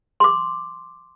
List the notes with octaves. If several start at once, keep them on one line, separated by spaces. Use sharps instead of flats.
C6 D6